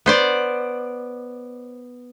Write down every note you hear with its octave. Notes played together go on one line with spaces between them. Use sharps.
B3 C5 D5